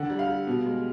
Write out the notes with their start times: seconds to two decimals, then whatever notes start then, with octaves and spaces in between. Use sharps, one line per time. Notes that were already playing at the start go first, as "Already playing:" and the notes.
Already playing: D3 F#5
0.09 G3
0.19 F5
0.28 G3
0.47 B2
0.66 G#3